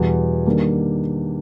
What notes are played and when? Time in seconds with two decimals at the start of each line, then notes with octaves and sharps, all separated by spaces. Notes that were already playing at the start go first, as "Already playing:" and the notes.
Already playing: E2 B2 G3
0.46 D#3 G3 A#3 D4